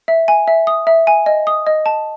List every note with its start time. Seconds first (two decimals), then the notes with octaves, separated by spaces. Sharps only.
0.08 E5
0.28 G#5
0.48 E5
0.67 D#6
0.87 E5
1.07 G#5
1.26 D#5
1.47 D#6
1.67 D#5
1.86 A5